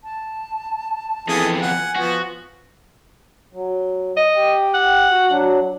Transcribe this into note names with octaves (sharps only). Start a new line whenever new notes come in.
A5
F2 E3 B3 G#4 A4 G#5
F#5 G#5
F3 B3 F#4
F#3
D#5
G4 G5
F#5
F#4
F#3 D4